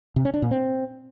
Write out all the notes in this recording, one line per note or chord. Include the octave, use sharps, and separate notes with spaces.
C3
C#4
D4
A#2
C4